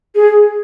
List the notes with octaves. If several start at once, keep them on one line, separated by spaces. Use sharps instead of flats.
G#4